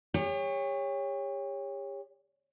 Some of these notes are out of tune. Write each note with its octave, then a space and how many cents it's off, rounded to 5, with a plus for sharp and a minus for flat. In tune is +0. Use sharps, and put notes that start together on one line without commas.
G4 +40 C#5 +0